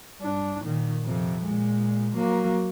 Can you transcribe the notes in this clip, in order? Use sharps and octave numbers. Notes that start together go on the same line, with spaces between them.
G2 D4
A#2 D#3
F2 C3
A#2 G#3
F#3 A#3